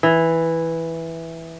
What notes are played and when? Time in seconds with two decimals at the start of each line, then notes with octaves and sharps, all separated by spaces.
0.03 E3